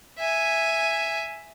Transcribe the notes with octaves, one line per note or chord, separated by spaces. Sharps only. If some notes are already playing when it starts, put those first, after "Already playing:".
E5 G#5